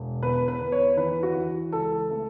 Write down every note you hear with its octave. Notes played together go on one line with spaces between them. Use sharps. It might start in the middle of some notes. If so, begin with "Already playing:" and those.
Already playing: E1
E2 B4
B4
E2
C#5
E3 B4
F#4
E3
C#2 A4
A3